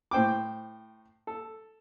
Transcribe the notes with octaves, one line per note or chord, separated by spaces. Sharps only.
A2 C5 G5 D6
A4